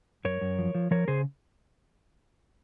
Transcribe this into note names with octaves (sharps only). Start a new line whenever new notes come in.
F#2 A#4 C#5
F#2
F3
F3
F3 A#4 C#5
C#3 G#4 C5